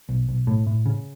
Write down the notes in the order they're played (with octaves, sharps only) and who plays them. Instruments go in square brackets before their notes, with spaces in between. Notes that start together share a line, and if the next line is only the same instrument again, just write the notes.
[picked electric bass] B1
B1
A2
A2
C#3